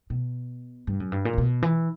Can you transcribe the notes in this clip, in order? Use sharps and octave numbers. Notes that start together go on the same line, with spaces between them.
B2
G2
F#2
G2
A#2
C#3
B2
E3